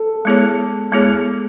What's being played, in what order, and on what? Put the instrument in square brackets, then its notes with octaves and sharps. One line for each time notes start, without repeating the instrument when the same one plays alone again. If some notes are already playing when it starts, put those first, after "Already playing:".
Already playing: [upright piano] A4
[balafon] G#3 B3 E4 G#4 C#5
G#3 B3 E4 G#4 C#5